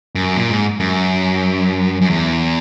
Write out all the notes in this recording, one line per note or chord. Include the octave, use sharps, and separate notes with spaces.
F#2
A#2
G#2
F#2
F#2
E2